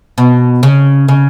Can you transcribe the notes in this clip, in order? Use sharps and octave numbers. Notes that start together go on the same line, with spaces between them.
B2
C#3
C#3